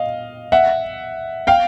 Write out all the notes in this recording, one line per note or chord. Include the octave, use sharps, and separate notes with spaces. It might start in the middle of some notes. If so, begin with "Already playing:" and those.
Already playing: D#5 F5
E5 F#5
F5 G5